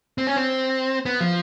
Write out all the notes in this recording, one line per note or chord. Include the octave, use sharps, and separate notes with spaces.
C4
C#4
C4
B3
F3